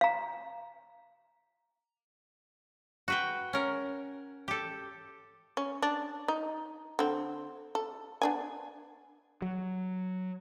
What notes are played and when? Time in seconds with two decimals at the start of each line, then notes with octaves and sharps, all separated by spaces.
0.01 F5 A#5
3.08 F#4 B4 G5
3.53 C#4 A#4
4.48 G4 A4
5.57 C#4
5.82 D4
6.28 D#4
6.99 D3 C4
7.75 A4
8.22 B3 D4 G#5
9.42 F#3